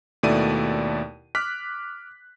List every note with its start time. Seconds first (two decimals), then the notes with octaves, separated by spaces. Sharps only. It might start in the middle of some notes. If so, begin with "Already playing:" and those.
0.23 D#2 B2 A3 E4 D5 D#7
1.35 D6 F6 F#6 B6